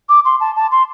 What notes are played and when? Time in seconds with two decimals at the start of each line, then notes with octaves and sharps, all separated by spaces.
0.09 D6
0.25 C6
0.40 A5
0.56 A5
0.72 C6